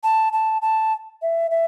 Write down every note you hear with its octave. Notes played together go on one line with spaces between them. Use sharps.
A5
A5
A5
E5
E5